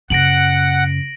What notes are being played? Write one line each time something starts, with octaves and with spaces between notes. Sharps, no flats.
F#2 C#3 F#5 A#6 D7 F#7